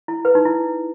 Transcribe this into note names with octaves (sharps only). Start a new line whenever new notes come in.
E4
B4
D#4
E4